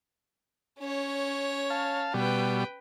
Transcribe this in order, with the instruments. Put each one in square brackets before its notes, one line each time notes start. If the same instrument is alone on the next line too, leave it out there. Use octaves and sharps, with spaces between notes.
[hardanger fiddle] C#4 C#5
[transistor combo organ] F5 A5
[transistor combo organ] B2 G3 [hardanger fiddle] B4 G5